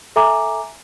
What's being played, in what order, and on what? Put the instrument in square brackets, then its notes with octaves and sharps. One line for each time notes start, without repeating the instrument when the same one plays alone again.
[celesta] A4 E5 G#5 A#5 D6